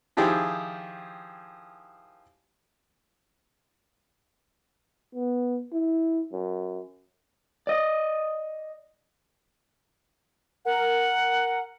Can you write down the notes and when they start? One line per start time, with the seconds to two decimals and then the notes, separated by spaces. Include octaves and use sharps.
0.17 D#3 F3 E4 G4 G#4
5.14 B3
5.73 E4
6.33 F#2
7.67 D5 D#5
10.65 A#4 F#5